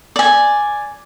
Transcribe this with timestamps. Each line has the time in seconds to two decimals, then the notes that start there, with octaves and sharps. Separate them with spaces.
0.16 D5 G#5